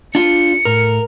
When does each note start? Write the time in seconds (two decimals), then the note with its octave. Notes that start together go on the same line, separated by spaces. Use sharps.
0.15 D4 F4 C#7
0.65 A2 A#4